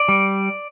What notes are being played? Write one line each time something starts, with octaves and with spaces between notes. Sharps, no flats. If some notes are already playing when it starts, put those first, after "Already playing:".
Already playing: D5
G3